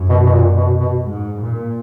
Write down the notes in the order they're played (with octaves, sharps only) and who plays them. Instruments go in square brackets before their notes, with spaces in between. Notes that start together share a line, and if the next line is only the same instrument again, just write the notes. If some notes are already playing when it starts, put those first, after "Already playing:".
Already playing: [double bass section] F#2
[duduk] B2
B2
A#2
B2
B2
[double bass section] G#2
A#2